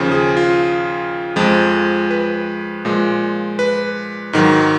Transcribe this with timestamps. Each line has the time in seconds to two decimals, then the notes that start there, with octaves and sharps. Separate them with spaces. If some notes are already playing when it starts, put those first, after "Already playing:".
Already playing: D#2 C#3 F3
0.11 G#4
0.37 F4
1.36 F2 F3 G#3
2.10 B4
2.85 A#2 F3 G#3
3.59 B4
4.33 G#2 D#3 F#3